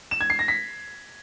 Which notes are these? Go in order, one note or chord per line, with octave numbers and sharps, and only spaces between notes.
E7
G#6
C7
A#6
B6